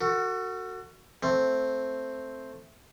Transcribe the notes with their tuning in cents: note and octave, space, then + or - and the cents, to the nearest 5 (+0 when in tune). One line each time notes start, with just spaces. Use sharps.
F#4 +0 A4 +40
A3 +0 C4 +0